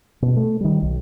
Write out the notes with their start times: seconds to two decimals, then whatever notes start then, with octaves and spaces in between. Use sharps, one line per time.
0.22 B2
0.37 A3
0.61 D#3 G3
0.82 B1